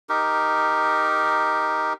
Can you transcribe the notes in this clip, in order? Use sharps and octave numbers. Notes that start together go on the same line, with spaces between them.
D#4 G4 A#4